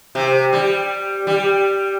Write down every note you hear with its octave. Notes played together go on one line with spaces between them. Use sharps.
C3
G3
G3